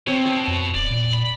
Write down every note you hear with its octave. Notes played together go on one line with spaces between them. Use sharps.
B2 C4 C#5
A5 C#6
F2
D1 D5
A#2
B5